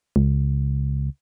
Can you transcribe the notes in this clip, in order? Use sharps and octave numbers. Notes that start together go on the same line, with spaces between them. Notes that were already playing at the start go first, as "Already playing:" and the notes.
C#2